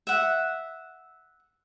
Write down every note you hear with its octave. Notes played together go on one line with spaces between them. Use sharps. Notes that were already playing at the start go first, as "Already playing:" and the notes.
E5 F#5